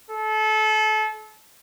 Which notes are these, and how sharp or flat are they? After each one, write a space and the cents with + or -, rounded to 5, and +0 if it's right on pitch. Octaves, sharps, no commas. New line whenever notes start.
A4 -30